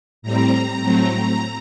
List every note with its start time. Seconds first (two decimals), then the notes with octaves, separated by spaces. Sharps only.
0.22 A2 G3 C4 A#5
0.79 A2 F#3 A3 C4